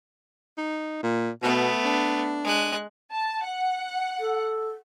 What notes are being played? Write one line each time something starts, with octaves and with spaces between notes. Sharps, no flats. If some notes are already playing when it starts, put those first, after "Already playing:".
D#4
A#2
B2 A3 B3
D4
G#3 F#6
A5
F#5
A4